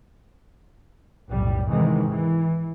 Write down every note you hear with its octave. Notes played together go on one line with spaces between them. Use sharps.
F1 B1 A2 G3
G#2 C3 D#3 E3 G#3
E3